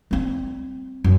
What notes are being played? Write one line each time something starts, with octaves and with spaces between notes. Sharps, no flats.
G3 C4
F#2